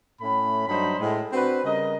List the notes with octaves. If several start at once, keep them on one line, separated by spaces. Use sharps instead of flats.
A2 A3 C#4 B5
G2 F#3 D4 D#4 C5 B5
A2 G#3
C4 D4 F#4 B4
C#3 G3 A#4 D#5